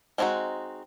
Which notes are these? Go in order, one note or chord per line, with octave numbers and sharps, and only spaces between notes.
G#3 C4 D4 D#4 F#4